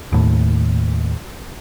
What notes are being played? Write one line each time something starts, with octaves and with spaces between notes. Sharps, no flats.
D#2 A2